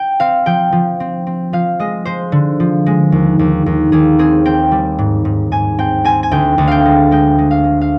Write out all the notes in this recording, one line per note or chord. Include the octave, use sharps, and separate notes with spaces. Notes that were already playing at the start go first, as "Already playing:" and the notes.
Already playing: G5
C4 F5
F3 G5
F3
C4
C4
F3 F5
G#3 D#5
G#3 C5
D3
F3
G#3
D#2
D#2
D#2
D#2 G#4
C4 G#4
C4 G5
G3
G#2
G#2
G#2 G#5
C4 G5
C4 G#5
G#5
D2 G5
D2
F5 G5
G#3
G#3 G5
G#3
F5
G#3
F5